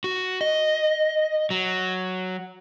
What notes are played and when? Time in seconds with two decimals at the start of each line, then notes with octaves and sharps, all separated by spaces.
0.04 F#4
0.41 D#5
1.50 F#3